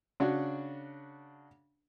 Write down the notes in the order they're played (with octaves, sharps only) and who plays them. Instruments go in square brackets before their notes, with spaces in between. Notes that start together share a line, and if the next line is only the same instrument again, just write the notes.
[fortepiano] C#3 D4 F#4